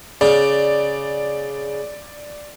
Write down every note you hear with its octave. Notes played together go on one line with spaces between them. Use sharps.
C#3 D5